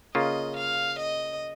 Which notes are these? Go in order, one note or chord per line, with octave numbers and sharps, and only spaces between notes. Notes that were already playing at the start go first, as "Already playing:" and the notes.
C#3 A#3 F4 D#5
F5
D#5